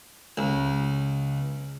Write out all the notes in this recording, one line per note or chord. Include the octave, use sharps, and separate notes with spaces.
C#2